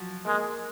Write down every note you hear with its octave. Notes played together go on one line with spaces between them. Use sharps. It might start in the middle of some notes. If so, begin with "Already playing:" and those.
Already playing: F3 F#3
G#3 A#3